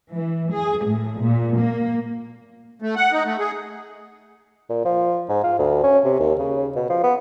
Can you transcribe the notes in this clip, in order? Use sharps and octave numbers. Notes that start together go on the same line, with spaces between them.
E3
G#4
A2
A#2
A#3
A3
F#5
D#4
A3
G#4
A#2
F3
G#2
F4
D2
C#4
C3
D#2
C#3
B2
F3
B3